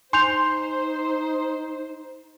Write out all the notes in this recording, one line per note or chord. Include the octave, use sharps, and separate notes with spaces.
D#4 C5 G#5 C6 G6 F7